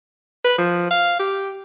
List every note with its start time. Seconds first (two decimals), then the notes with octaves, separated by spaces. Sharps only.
0.44 B4
0.58 F3
0.91 F5
1.19 G4